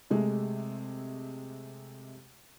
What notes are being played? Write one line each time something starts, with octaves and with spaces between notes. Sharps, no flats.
C3 G#3 A3